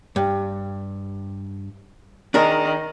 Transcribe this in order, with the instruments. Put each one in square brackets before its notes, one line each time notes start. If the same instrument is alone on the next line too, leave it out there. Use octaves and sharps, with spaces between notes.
[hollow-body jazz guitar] G2
[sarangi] D#3 [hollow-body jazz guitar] D4 G#4 A#4